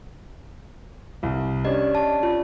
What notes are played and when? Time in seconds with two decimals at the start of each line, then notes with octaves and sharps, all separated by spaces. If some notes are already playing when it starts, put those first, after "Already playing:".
1.23 C2
1.65 C#4 D4 G4 D#5
1.95 A5
2.23 F4